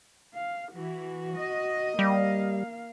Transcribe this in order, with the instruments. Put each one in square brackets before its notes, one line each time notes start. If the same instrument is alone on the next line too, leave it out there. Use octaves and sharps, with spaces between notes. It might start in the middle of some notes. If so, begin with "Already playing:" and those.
[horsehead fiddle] F5
[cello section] E3 [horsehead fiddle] F#4
[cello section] D#5
[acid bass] G3 [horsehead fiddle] A#3 F5